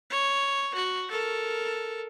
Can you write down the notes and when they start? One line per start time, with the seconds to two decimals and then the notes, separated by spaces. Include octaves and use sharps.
0.10 C#5
0.74 F#4
1.11 A4 A#4